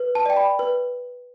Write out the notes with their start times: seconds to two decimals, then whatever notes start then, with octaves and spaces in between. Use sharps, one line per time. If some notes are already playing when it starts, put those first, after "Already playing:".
Already playing: B4
0.15 A5
0.26 D5 G5
0.37 B5
0.59 B4